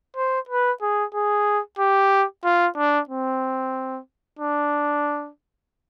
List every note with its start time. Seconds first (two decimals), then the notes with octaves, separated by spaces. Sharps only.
0.17 C5
0.49 B4
0.82 G#4
1.14 G#4
1.79 G4
2.45 F4
2.77 D4
3.09 C4
4.39 D4